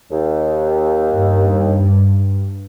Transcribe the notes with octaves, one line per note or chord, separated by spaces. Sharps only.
D#2
G2